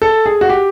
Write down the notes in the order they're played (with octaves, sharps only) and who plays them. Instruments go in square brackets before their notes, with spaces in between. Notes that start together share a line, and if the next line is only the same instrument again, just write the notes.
[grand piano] A4
G#4
F#4
G4